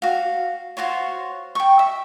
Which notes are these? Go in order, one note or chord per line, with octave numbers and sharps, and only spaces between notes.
F#4 F5
F4 F#4 C5 C#5
G5 C#6
E5